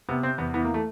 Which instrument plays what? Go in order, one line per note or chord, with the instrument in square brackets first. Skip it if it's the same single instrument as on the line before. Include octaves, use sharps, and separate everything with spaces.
[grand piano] C3 B3
C3 C4
E2 B3
E3 B3
A#3
A3